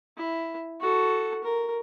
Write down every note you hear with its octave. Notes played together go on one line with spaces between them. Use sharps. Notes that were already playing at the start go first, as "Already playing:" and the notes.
E4
F#4 A4
A#4